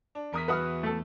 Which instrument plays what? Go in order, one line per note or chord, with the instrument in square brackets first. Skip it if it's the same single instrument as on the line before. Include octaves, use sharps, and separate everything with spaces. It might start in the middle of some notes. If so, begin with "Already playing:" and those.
[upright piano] D4
[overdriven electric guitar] E2 [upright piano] A#4 D#6 B6
[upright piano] F#4 E5 F#5 [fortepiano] B4 D#6 F6
[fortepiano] A3 A4